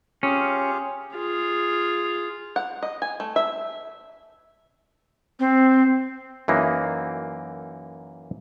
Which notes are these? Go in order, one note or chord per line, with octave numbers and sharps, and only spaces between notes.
C#4 F4 G4 G#4
F4 G#4
F#5
D#5
G#5
A3
E5
C4
F#2 E3 A#3 D#4